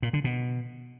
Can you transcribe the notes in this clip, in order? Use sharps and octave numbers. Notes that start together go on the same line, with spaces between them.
A#2
D3
B2